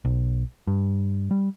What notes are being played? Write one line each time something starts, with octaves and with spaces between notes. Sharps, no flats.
B1
G2
G3